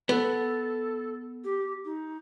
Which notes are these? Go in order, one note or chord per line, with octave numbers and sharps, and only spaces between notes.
B3 A4
G4
D#4